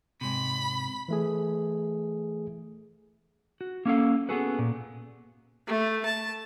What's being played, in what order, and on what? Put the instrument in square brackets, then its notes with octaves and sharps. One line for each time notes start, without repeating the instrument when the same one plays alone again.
[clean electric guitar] G#2 C3 [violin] B5
[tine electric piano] E3 A3 G#4
[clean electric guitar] F#4
A#3 C#4 A4 F5
B3 C#4 F#4 G#4 A4 B4
A#2
[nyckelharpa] A3
A5